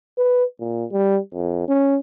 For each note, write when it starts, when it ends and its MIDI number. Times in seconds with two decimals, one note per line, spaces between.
0.18 0.44 71
0.60 0.85 46
0.92 1.19 55
1.34 1.67 41
1.68 1.98 61